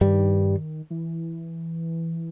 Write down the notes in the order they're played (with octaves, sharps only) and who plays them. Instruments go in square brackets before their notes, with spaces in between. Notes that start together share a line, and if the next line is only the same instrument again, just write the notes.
[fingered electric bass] G2 G3 [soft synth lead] D#3
[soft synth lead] E3